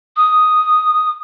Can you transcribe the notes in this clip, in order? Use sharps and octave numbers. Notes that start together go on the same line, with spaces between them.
D#6